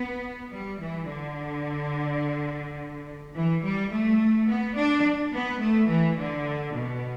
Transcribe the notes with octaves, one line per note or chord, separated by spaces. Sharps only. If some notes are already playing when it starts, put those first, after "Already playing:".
Already playing: B3
G3
E3
D3
E3
G3
A3
B3
D4
B3
A3
E3
D3
B2